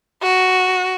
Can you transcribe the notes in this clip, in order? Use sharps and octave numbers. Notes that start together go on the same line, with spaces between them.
F#4